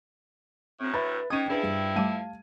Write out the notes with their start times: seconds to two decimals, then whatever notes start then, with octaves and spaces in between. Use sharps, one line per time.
0.80 D2 A2 C4
0.94 B4 E5 B5 A6
1.30 G#2 C#4 D#4 G5 D#6 G#6 D#7
1.48 F3 D4 E4 G#4 B4
1.63 G2
1.96 G3 A3 F5 A5 D#7